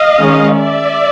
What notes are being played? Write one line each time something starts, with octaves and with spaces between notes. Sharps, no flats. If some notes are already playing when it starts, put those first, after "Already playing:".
Already playing: D#5 F5
D#3 G#3 C#4
D5 E5